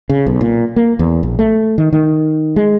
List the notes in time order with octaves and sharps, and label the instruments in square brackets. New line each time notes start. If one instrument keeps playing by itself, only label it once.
[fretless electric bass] C#3
B1
A#2
A#3
E2
A#1
A3
D#3
D#3
G#3